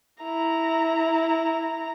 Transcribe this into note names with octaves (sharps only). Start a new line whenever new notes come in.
E4 A#5